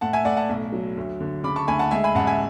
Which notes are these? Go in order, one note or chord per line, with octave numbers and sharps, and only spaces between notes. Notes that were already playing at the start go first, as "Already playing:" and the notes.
A2 F#5 A5
E5 G#5
A2 D5 F#5
F#5 A5
B1
F#3
D2
D3
C#3 B5 D6
A5 C#6
D2 G#5 B5
F#5 A5
G#3 E5 G#5
G#5 B5
A1 F#5 A5
E5 G#5